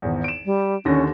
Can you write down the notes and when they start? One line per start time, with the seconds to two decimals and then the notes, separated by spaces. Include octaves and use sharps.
0.02 G#1 E2
0.24 D7 E7
0.45 G3
0.85 D#2 D3 C#4 A#6